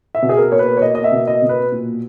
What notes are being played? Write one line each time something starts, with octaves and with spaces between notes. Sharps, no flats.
E5
B2
G#4
A#4
A#3 C#5
B4
C#5
A#3 D#5
D#5
E5
B2
D#5
B2
B4
A#2